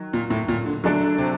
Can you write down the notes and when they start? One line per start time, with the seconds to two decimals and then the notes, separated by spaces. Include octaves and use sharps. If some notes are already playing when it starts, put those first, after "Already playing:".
Already playing: D#3 F#3
0.13 A#2
0.30 A2
0.48 A#2
0.66 D3
0.84 D3 F#3 A3 D4 A4
1.18 C3